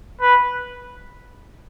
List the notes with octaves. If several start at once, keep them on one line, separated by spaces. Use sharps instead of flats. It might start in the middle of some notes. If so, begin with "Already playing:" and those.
B4